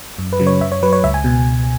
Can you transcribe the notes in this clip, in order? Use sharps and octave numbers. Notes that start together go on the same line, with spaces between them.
F#2
B4
C#3 F#3
C#5
F#2 E5
C#5
F#3 B4
C#5
C#2 E5
G#5
B2